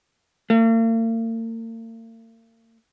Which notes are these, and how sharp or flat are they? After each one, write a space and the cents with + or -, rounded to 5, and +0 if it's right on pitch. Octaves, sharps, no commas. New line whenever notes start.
A#3 -45